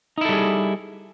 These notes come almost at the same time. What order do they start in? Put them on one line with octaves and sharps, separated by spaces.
D#4 E4 A4 G3 G#4